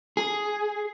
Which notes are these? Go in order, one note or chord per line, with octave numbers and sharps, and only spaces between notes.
G#4